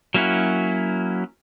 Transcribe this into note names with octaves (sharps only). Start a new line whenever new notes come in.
F#3 A#3 C#4 E4 F#4